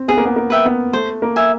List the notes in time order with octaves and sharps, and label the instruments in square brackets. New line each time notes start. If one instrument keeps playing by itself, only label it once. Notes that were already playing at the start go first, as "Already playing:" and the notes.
Already playing: [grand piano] C4
[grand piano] B3 [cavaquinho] G#4
[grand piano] A#3
B3
A#3
[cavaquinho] B4 E5 G5
[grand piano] B3
[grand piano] A3 [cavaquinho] C5
[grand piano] A#3
[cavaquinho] E5 G#5